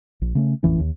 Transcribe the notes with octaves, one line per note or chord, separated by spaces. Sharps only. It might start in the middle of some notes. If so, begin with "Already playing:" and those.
A#1
C#3 A3 C#4
A1 F2 E3 C#4
D#2